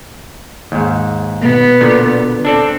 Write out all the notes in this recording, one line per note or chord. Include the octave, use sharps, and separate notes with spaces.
D#2 G#2
B2 B3
A#2 D3
C4 D4 A4 D5